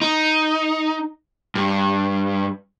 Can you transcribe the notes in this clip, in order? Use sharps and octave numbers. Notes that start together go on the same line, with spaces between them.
D#4
G2